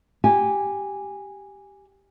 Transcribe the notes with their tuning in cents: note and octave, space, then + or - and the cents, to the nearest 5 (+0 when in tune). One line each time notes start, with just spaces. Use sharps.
G4 +0 G#5 -10